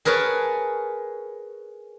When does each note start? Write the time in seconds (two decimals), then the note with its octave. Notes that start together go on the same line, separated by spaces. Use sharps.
0.05 G#4 A#4 B4 C#5 A5